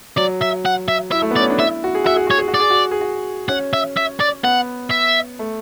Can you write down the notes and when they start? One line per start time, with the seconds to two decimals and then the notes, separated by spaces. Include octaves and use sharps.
0.17 F#3 D5
0.41 E5
0.65 F#5
0.88 E5
1.12 E4 E5
1.22 A3
1.31 B3
1.36 D5
1.40 C#4
1.50 D4
1.59 E4 E5
1.84 F#4
1.95 G#4
2.04 F#4 E5
2.16 G#4
2.27 F#4 C#5
2.38 G#4
2.48 F#4
2.54 D5
2.60 G#4
2.70 F#4
2.91 G#4
3.01 F#4
3.49 C#4 F#5
3.73 E5
3.97 E5
4.20 D5
4.44 B3 F#5
4.91 E5
5.39 A3